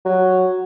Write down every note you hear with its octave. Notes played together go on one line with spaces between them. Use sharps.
F#3